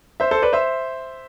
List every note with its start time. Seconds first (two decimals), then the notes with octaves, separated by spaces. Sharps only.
0.20 C5 E5
0.31 A4 C5
0.42 B4 D5
0.53 C5 E5